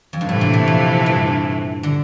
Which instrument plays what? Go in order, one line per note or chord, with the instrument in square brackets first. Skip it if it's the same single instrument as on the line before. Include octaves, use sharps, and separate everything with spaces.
[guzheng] F2
G2
[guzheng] A2 [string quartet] C3 E3 A3
[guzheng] A#2
A#2
F2
G2
D3